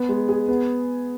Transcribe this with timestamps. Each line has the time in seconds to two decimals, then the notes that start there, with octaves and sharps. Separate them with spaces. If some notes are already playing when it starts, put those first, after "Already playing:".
Already playing: B3
0.09 G#3
0.29 G#4
0.48 B3